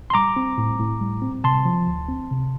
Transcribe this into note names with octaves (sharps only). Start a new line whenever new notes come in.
C6
G3 A#5 D6
C4
A2
A2
G3
C4
C3 A5 C6
F3
D2
C4
C3